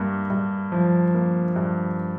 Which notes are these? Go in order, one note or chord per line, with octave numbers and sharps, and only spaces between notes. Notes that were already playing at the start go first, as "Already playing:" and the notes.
Already playing: G2 A#3
G2
F3
A#3
G2